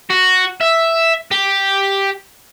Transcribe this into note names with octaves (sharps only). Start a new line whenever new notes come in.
F#4
E5
G4